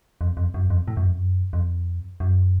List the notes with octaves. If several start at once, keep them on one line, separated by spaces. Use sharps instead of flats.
F2
F2
F#2
F2
A2
F#2
F2
F#2
F2
F#2